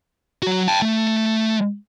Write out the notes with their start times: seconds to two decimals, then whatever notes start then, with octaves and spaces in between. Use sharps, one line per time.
0.43 F#3 F#4
0.68 G5 A5
0.82 A3